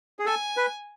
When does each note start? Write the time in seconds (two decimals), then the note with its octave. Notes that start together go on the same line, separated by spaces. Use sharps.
0.19 G#4
0.26 A4 G#5
0.57 B4